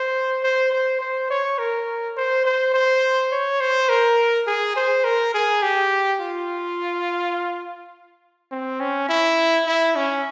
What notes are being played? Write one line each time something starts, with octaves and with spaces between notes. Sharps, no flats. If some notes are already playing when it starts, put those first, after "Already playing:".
Already playing: C5
C5
C5
C5
C#5
A#4
C5
C5
C5
C#5
C5
A#4
G#4
C5
A#4
G#4
G4
F4
C4
C#4
E4
E4
C#4